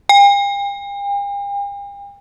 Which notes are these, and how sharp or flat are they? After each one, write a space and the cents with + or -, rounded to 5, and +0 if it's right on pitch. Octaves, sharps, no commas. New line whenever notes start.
G5 +45